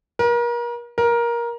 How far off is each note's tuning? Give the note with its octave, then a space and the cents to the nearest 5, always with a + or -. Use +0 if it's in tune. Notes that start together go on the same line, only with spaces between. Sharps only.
A#4 +35
A#4 +15